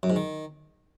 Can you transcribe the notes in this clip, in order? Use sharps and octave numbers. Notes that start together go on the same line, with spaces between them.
F#2
G#2
D#3